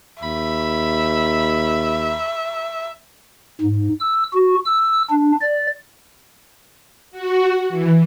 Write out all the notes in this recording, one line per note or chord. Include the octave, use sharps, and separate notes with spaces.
D#2 E5 B5
G#2
E6
F#4
E6
D4
D5
F#4
E3